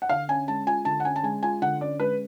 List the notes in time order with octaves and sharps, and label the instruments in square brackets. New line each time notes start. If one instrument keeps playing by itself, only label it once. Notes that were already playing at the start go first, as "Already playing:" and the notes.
[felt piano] F#5
[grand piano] D3 [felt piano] F5
[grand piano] C#4 [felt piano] G#5
[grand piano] G#3 [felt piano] A5
[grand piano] F4 [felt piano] G#5
[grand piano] D3 [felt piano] A5
[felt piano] F#5
[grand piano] C#4 [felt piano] G#5
[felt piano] A5
[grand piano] G#3 [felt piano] G#5
[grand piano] F4 [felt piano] G#5
[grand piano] D3 [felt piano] F#5
[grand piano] C#4 [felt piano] D5
[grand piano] G#3 [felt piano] B4